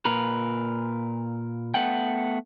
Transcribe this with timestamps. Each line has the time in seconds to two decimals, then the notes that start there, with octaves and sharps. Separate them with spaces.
0.05 A#2 A#4 B4
1.74 A3 B3 F#5 G5